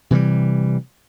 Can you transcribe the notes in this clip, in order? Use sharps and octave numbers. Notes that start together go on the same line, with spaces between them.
C3 E3 F3 G3